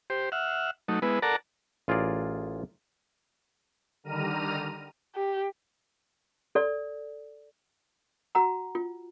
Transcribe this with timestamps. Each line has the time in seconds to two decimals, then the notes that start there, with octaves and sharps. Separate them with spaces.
0.10 G4 C5
0.32 E5 F#5 F6
0.88 F#3 A3 D#4
1.02 G#3 B3 E4 B4
1.22 A4 A#4 D5 F#5 A5 A#5
1.88 A1 F4 G#4 A#4 D5
4.04 D3 D#3 G3 A#5 F6 D#7
5.16 G4
6.55 A4 D5
8.35 F#4 F#5 A#5
8.75 F4